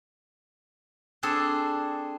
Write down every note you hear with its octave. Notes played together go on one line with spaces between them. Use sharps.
C4 D4 G#4 A4